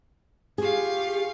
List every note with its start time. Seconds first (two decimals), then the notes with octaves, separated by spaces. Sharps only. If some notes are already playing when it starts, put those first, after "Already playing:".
0.58 F4 G4 G#4 F5 C#6